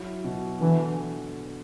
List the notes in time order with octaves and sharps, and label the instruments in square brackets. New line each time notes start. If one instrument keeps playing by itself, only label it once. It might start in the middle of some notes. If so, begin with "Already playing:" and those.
Already playing: [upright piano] F#3 E4
B2
[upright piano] D3 [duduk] E3